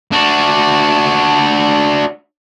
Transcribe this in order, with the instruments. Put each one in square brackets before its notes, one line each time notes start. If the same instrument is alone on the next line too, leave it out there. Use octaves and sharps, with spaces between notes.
[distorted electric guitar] D4 F#4